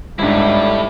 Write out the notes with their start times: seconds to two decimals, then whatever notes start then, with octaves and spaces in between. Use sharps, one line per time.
0.19 G1 G#2 G3 A3 D4 E4